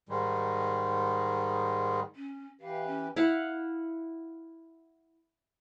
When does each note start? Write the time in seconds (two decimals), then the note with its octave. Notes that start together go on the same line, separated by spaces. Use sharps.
0.09 G#2 D#3 G3 G#3
2.16 C#4
2.61 E3 G4 B4 F5
2.87 C#4
3.16 E4 F5 F#5